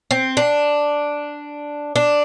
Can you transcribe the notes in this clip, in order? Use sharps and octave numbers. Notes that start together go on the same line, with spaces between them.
C4
D4
D4